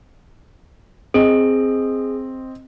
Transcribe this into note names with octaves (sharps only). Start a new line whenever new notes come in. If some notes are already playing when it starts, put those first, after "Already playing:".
C4 G#4 D#5